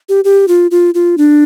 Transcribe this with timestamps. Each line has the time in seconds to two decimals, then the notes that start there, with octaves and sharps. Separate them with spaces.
0.09 G4
0.24 G4
0.48 F4
0.71 F4
0.95 F4
1.18 D4